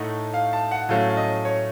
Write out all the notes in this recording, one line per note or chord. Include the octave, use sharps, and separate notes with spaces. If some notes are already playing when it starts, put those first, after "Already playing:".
Already playing: A2 A3 D#4 F#5
F5
A5
F#5
A2 F#3 A3 C#4 F5
F5
D#5
C#5